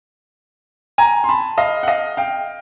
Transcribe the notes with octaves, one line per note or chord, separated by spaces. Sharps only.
G#5 A#5
C6
A5 B5
D#5 F5
F#5
D#5 F5
F5 G5